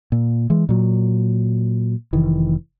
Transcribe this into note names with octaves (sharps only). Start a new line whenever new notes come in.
A#2
E3 G#3
A#2 F#3
F1 D#3 E3